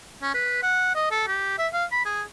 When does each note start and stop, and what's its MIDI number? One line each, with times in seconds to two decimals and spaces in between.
0.22 0.34 61
0.34 0.62 71
0.63 0.90 78
0.95 1.08 75
1.11 1.22 69
1.27 1.55 67
1.58 1.68 76
1.73 1.84 77
1.92 2.01 83
2.05 2.22 68